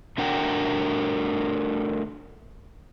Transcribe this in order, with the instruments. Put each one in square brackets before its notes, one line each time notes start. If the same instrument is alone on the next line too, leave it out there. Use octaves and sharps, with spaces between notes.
[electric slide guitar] A3 D4 F#4 A#4 F#5 G5